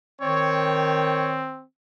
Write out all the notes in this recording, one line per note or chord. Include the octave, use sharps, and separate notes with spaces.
D#3 C4 C#5